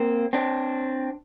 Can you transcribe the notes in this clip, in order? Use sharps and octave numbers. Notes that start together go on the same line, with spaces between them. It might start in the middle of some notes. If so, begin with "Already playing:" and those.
Already playing: A#3 C4
C4 D4